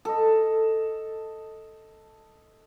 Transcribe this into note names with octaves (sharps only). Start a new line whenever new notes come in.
A4 D#5